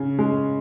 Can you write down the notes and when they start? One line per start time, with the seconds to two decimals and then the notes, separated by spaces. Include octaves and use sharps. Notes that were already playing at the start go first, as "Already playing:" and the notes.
Already playing: C#3 C#4
0.19 G#3